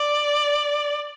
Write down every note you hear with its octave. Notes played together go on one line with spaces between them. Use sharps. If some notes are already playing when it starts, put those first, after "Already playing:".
Already playing: D5